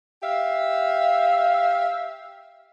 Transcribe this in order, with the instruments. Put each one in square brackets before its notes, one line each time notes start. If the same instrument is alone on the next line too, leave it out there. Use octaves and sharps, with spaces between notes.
[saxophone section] G4 E5 F5